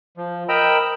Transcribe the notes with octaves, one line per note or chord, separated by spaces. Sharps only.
F3
A#4 D#5 G5 A#5 B5 E6